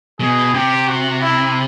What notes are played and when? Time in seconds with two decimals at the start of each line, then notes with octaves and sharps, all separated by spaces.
0.20 B2 G#4
0.54 C3 G4
0.88 F#4
1.21 E4